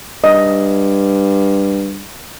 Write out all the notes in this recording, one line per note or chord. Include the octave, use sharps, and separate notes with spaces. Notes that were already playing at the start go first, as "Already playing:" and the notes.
G2 D#5